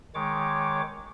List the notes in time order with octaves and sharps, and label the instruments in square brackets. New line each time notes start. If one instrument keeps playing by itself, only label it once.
[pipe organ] D#3 G#3 C#5 D6